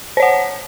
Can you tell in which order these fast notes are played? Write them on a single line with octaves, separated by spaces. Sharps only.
C5 C#5 F#5